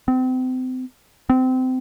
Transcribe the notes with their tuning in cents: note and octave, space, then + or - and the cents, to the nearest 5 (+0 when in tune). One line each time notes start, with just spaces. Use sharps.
C4 -35
C4 -25